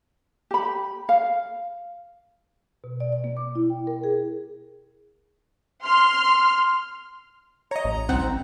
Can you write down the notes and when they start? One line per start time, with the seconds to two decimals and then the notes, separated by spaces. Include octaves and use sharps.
0.51 G4 B5
1.09 F5
2.84 B2
3.00 D5
3.13 D5
3.24 A#3
3.37 D6
3.55 E4
3.70 G5
3.87 A#4
4.04 G#4
5.83 C6 F6
7.71 C#5 D#5 A#5
7.85 A1
8.09 C2 C4 F#5